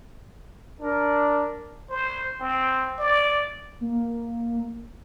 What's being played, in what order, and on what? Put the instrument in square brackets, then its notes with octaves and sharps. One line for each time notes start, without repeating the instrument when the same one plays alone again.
[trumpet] D4 [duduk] A#4
[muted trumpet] C5
C4
D5
[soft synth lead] A#3